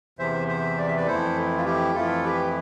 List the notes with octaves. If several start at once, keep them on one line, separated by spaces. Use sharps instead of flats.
E2 C3 E3 C5 E5
C5 E5
D5
E5
B4 D5
F2 E3 A3 E4 A4 C5
F4
E4 G4
F2 E3 A3 E4 F4 A4
G4 B4